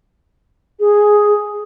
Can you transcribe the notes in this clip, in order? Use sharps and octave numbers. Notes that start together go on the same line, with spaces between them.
G#4